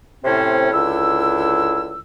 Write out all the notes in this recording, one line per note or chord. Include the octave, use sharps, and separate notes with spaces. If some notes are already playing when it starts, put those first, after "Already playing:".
A2 C3 C4 C#4 C5
C#2 D3 E4 E6